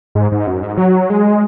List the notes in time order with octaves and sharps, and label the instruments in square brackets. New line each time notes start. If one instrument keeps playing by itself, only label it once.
[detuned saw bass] G#2
G#2
F#2
G#2
F#3
G#3